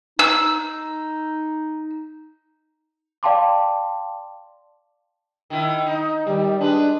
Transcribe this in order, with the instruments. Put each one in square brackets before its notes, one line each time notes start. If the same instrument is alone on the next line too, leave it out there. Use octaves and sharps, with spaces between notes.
[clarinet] D#4 [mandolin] E6
[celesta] D5 F5 G5 A5 C6 D6
[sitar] D#3 E4
D#4
[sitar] D#3 [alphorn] G3
[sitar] G#3 B4 [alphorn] D4